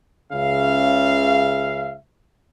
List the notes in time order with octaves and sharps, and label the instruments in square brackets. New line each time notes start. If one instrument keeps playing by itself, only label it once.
[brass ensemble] C#2 C#3 E5 F5